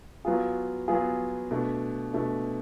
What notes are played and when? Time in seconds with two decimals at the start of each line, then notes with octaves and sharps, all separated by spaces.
0.25 F#3 B3 F4 G#4
0.88 F#3 B3 F4 G#4
1.51 B2 A3 D4
2.14 B2 A3 D4